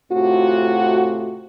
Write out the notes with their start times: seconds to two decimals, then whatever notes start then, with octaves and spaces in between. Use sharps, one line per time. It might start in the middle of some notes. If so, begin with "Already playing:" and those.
0.11 A2 C3 A3 F4 F#4